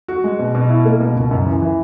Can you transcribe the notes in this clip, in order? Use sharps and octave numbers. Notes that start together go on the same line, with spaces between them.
F#4
G#3
B2
B2
E4
A#3
B2
C#2
F#2
E3
E3